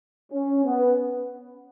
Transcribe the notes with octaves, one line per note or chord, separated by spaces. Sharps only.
C#4
B3